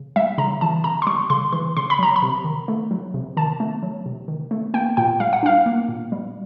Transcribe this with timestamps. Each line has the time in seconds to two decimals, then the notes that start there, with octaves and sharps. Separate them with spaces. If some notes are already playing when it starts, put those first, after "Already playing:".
Already playing: C#3
0.16 G3 E5
0.38 C#3 A#5
0.61 E3 A5
0.84 C#3 A#5
1.02 C6
1.07 G3 C#6
1.30 C#3 C6
1.53 E3 C6
1.77 C#3 C6
1.90 B5
1.99 F#3 A#5
2.16 B5
2.22 C3
2.44 D#3
2.68 A3
2.91 F#3
3.14 C3
3.37 D#3 A5
3.60 A3
3.83 F#3
4.06 C3
4.28 D#3
4.51 A3
4.74 A#3 G5
4.97 A#2 G5
5.20 G3 F5
5.33 F#5
5.43 D4 F5
5.66 A#3
5.89 A#2
6.12 G3